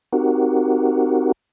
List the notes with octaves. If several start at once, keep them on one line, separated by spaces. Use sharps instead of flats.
C4 D#4 F#4 G4 A#4 F#5